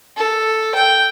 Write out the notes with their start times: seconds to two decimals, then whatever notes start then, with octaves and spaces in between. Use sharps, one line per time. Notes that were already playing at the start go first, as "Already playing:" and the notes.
0.16 A4
0.75 G5